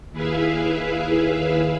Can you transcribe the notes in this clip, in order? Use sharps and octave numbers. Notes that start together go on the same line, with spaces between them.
D#2 E4 G#4 B4 E5 F5